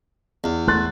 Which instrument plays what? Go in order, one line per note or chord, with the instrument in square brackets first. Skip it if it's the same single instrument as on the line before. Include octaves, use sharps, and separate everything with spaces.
[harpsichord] E2
[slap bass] A3 [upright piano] C6 F#6 A6